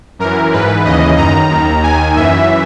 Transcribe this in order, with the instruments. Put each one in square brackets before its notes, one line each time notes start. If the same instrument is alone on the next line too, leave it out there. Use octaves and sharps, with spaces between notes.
[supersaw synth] F#2 E3 A#4
G#2 E3 B4
D#2 C#3 E3 D#5
F#2 D#3 A#5
D#2 D#3
D#2 D#3 G#5
F#2 E3 E5